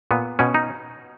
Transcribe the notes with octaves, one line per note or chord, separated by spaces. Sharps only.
A#2 B3
B2 C#4
D#4